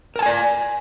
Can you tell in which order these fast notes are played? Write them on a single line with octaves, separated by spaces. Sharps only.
A#4 A5 G#5 D5